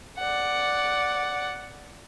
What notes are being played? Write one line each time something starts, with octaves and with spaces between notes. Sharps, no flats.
D5 F#5